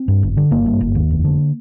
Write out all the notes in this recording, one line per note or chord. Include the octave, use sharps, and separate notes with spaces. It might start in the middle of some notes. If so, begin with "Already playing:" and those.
Already playing: C4
G2
G1
D3
G1 A#3
G2
G1
D#2
F1
D3